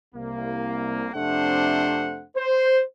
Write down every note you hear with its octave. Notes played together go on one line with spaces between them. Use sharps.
C2 A#3
F2 C3 A3 D4 C5 F#5
C5